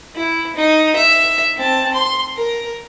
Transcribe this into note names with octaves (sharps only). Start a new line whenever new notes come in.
E4
D#4
E5
C4 A5
C6
A#4